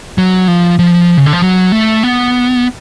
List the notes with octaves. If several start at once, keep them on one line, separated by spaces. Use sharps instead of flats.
F#3
F3
F3
C#3
D3
F3
F#3
A3
B3